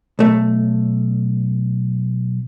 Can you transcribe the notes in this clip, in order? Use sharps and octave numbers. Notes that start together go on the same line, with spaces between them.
B1 A3